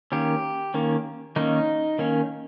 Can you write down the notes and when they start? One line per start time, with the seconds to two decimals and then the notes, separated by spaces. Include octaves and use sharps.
0.12 D#3 A#3 C#4 G4
0.74 D#3 A#3 C#4
1.36 D#3 A#3 C#4 D#4
1.99 D#3 A#3 C#4